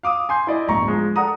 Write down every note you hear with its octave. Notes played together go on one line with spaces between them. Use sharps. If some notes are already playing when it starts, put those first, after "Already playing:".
F5 D6 D#6
G#5 C6 G6
E4 D5 D#5
D1 G1 A#5 C#6
F3 G#3
A4 D5 F#5 A#5 D#6